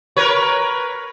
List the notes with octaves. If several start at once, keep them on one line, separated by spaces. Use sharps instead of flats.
A#4 B4 C#5